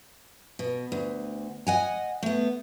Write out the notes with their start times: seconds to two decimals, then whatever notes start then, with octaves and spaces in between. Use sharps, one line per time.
0.59 B2
0.92 D2
1.67 D#5 F#5 G#5
2.23 A3 B3